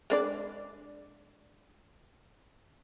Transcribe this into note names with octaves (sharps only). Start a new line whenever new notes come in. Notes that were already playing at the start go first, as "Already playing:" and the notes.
G#3 D4 D5